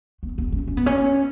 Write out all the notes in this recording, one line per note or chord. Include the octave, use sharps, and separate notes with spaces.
B3
B3
C#4
C#4
B3
C#4